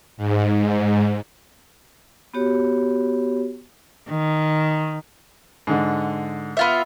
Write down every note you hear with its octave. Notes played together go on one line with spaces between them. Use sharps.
G#2
B3 F#4 G4 C#5
D#3
G#2 D3
B3 F4 E5